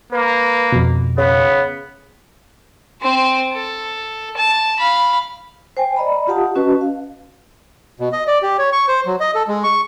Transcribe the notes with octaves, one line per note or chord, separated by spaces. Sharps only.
A#3 B4
F2 B2
C#3 B3
C4 C5
A4
A5
F5 B5
C5 G5 G#5
D5 D#5 A#5 B5
F4 G4 F5 F#5 A5 D#6
C#4 F#4 B4 D#5 A5
F5
B2
D#5
D5
G4
C#5
C#6
C5
F#3
D#5
A4
G#3
C#6